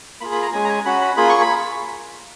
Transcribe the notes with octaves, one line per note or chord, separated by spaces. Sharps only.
A#3 F4 G#4 B5
B5
A#5
G#3 C#4 G#4 G#5
A#5
G#5
C#4 F#4 B5
B5
A#3 F4 G#4 B5
C#6
B5